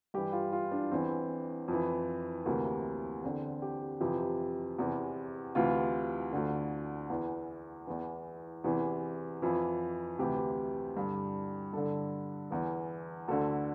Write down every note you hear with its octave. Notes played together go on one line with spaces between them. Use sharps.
G2 E3 G4
F4
F4
D4
E2 E3 C4
F2 E3
D2 C3 E3 A#3
E2 D3 C4
G4
F2 C3 E3 G4
E2 C3 E3
D2 C3 E3 F4
D2 D3
E2 E3
E2 E3
E2 C3 E3
F2 E3
D2 C3 E3 G4
G2 D3
G2 D3 A4
E2 E3
D2 D3 A4